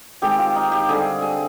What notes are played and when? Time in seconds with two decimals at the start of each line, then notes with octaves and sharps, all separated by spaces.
0.22 D#3 G#3 C4 G4
0.39 F4
0.56 D#4
0.72 G4
0.89 D3 G3 C4 G#4
1.22 G#4